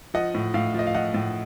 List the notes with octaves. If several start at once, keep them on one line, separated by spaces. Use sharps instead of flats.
F3 D#5 F#5
A2
A2 F5
F3 D#5
F5
F3 D#5 F#5
A2